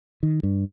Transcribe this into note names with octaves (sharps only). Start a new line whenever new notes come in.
D#3
G2